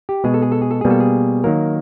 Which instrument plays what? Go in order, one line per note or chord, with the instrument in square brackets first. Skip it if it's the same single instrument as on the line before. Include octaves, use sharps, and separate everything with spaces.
[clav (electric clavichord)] G4
B2 G#3 G#4
A4
G#4
A4
G#4
A4
B2 G3 A#3 G#4
A4
G#4
D#3 F#3 A#3 A#4